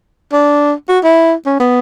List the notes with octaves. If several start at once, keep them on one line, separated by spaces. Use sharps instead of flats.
D4
F#4
E4
C#4
B3